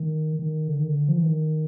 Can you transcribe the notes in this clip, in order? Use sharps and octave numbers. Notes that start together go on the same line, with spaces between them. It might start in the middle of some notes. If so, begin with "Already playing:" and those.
Already playing: D#3
D#3
D3
D#3
D3
F3
E3
D#3